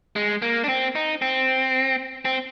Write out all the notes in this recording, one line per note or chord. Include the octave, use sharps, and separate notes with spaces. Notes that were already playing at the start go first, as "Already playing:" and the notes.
G#3
A#3
D4
C4
D#4
C4
C4